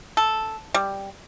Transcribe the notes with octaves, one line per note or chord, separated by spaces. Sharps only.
A4
G3